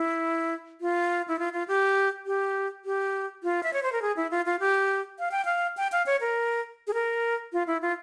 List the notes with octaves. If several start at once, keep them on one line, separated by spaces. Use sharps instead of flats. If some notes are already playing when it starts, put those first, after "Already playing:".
Already playing: E4
F4
E4
F4
F4
G4
G4
G4
F4
E5
C#5
C5
A#4
G#4
E4
F4
F4
G4
F5
G5
F5
G5
F5
C#5
A#4
G#4
A#4
F4
E4
F4